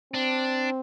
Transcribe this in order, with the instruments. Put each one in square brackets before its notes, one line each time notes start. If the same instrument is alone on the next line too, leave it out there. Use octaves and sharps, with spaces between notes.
[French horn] C4 [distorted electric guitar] D4